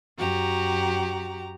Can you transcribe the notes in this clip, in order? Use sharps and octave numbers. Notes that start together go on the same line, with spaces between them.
F#2 F#4 G4 A#5